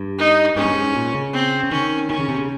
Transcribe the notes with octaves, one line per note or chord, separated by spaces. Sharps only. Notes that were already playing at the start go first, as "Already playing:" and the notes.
Already playing: G2
D#4
G#2 C#4
G2
G#2
A#2
C#3
C4
C#3
D#3 C#4
D#3 C#4
C#3
C3
C#3